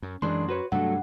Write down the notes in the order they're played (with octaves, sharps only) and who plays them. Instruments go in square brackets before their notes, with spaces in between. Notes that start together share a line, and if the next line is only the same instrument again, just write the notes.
[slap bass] F#2
[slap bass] F#2 [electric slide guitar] E3 G#3 D4 [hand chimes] C6
[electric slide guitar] F#4 B4 C#5
[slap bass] G2 C3 D4 [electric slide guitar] F#3 A3 A4 [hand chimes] F#5